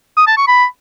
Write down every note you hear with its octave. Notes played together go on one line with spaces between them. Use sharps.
D#6
A5
C#6
B5